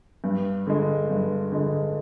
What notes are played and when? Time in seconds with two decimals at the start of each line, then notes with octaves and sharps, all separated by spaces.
0.24 G2
0.67 D3 G#3
1.10 G2
1.52 D3 G#3